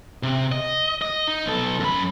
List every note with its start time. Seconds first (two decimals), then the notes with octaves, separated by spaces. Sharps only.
0.23 C3
0.52 D#5
1.02 D#5
1.27 D#4
1.46 B1 A4
1.80 F#2 B5